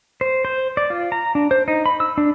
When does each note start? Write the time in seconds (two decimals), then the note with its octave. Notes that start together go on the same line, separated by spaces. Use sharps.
0.21 C5
0.45 C5
0.77 D5
0.90 F4
1.12 A#5
1.35 D4
1.51 C5
1.68 D#4
1.86 B5
2.00 E6
2.18 D4